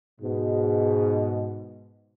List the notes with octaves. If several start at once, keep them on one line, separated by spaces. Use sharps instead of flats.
G#2 B2